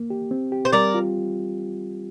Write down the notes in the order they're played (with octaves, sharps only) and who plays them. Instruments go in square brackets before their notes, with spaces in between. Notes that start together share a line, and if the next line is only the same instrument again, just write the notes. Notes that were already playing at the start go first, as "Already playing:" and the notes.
Already playing: [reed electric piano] A#3
G4
C4
G4
[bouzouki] C5
[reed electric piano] G3 [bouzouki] A#4 D5
[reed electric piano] F4